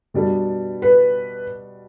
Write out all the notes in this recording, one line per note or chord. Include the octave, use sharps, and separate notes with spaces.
B2 G3 D4 A4
B4